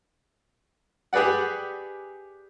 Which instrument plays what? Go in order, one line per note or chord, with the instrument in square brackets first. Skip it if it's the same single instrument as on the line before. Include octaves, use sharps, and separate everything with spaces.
[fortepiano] G4 G#4 B4 D5 F#5